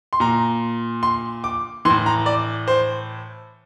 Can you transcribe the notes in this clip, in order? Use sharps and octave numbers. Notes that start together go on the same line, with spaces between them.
C6
A#2 A#5
C6
D6
A2 E3 C6
A#5
D5
C5